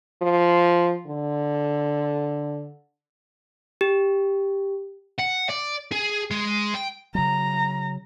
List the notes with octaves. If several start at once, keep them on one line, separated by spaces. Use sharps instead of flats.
F3
D3
G4
F#5
D5
G#4
G#3
G5
C#3 F#3 A#5